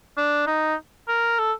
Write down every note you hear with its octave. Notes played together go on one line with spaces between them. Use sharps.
D4
D#4
A#4
A4